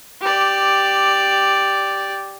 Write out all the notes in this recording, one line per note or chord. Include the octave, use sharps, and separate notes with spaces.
G4 D5